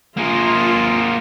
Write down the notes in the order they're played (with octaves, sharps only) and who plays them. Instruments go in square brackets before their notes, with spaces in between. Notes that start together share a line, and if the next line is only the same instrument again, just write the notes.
[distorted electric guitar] A#3 G#4 [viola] F4